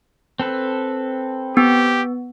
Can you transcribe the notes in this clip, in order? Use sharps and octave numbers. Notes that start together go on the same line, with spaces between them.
C4 A4 B4
B3 G4